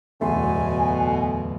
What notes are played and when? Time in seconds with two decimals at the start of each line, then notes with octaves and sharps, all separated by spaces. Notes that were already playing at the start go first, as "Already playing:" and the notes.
0.21 D1 E2 B2 A3 G#5 C6